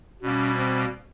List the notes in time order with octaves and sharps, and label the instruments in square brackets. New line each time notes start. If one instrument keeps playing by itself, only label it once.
[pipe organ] B2 G3 A#3 [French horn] C#4
[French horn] C4